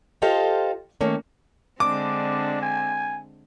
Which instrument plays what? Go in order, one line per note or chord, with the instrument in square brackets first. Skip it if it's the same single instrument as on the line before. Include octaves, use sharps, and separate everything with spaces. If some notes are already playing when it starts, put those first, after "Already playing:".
[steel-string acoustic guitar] F4 G4 A4 C5 D#5 F5
D#3 A3 A#3 C#4
[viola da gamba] D3 G#3 C4 [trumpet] D4 [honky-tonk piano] D6
[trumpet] G#5